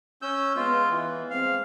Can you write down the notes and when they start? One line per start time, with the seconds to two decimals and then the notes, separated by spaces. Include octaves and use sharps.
0.22 C#4 E6 G6
0.56 G#3 B3 F4
0.90 E3
1.31 G#3 C4 F5